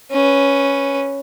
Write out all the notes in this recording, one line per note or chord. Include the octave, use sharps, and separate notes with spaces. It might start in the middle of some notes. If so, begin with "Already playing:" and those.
C#4 B4